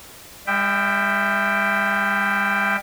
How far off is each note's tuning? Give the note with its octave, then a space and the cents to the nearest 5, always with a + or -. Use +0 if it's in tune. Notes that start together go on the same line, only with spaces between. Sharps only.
G3 +45 E5 +0 G5 +0